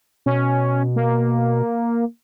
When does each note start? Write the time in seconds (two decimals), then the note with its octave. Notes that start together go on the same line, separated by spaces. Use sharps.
0.26 B2 C#4
0.96 A#3